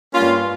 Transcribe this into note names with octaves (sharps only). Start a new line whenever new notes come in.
G2 G3 A#3 C#4 F4